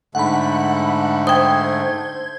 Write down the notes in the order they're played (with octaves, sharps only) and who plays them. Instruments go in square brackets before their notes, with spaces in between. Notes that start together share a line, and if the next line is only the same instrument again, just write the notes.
[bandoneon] G#2 D3 A3 [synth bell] F#5 B5
[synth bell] C5 G#6 [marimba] G5 D#6